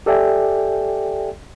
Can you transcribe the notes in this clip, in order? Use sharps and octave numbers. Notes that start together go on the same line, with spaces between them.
G4 A4 D5 E5 G5 G#5